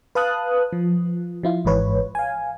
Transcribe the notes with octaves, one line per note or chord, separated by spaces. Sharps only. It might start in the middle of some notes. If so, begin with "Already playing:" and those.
B4 F5 A5 D#6 F#6
F3
F3 E4 F4
G#1 G#2 E3 B4 C#5
F5 G#5